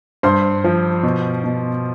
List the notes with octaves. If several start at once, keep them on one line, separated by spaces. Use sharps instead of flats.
G2 C5 C6
F3
B2
B2